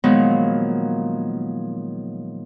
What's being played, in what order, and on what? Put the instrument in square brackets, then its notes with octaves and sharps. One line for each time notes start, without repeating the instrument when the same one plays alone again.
[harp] A#2 D#3 F3 F#3 G#3 B3